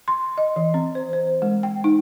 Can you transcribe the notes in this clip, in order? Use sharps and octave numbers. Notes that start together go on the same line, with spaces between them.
C6
D#5
E3
C4
C5
C5
G#3
G5
D#4